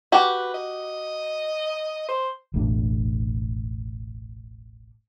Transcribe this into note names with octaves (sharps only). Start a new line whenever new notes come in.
F#4 G4 B4
D#5
C5
E1 A1 A2 D4